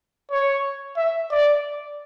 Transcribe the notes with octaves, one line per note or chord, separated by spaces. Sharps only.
C#5
E5
D5